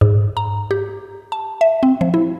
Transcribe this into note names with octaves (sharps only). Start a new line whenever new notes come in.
G#2
A#5
G4
A5
E5
C4
F3
E4